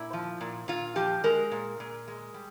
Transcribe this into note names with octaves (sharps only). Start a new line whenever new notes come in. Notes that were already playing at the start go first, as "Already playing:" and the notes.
Already playing: A#2 E4
F3
A#2
A#2 F4
F3 G4
G#3 A#4
A#2
A#2
G#3
G3